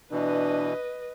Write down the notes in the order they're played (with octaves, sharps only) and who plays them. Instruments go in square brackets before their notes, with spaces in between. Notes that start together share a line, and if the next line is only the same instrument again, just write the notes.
[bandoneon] B2 E3 [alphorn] D4 [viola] B4 D#5